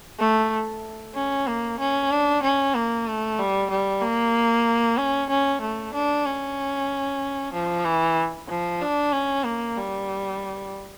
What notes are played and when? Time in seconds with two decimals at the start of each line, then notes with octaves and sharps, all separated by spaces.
0.19 A3
1.15 C#4
1.47 A#3
1.79 C#4
2.11 D4
2.42 C#4
2.75 A#3
3.07 A3
3.39 G3
3.70 G3
4.02 A#3
4.98 C#4
5.30 C#4
5.61 A3
5.94 D4
6.26 C#4
7.53 F3
7.85 E3
8.49 F3
8.81 D4
9.12 C#4
9.44 A#3
9.77 G3